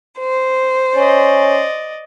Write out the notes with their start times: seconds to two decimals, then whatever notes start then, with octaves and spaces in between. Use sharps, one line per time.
0.19 C5
0.96 C#4 D5 D#5